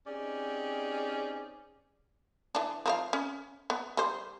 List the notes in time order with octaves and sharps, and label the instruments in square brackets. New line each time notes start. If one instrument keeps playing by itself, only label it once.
[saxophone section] C4 C#4 D#4 G4 G#4 D5
[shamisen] E3 D4
F3 A#4 F5
C#4
B3
G3 C5